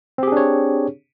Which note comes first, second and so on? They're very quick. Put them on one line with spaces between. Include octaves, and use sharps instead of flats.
C4 G4 G#4 D4 C#5